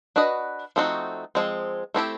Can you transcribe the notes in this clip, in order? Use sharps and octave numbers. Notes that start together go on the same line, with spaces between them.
D4 F#4 B4 D#5
F3 A3 C4 D#4 F#4
F3 G#3 C4
A3 C4 E4 G4